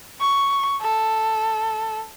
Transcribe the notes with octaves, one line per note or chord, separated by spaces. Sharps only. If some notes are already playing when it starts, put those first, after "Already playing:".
C#6
A4